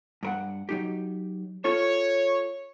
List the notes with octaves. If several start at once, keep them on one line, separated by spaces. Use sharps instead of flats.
G2 A#4 F#5
F#3 D#4 G4
F4 A4 C#5